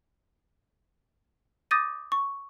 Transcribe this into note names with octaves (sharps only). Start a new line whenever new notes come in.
D6 D#6 G6 A6 A#6 D#7
C#6